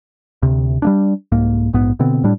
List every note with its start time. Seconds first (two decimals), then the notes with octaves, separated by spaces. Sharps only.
0.42 D2 C3
0.82 G3 A#3 D4
1.32 C2 G#2 A#3
1.73 A#1 G#2 B3
1.99 B2 D3 B3 C4
2.24 A2 G3 D4